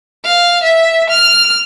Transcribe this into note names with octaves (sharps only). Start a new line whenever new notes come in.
F5
E5
F6